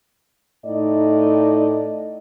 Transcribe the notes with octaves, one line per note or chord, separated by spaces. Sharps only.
A2 D#4 D5 D#5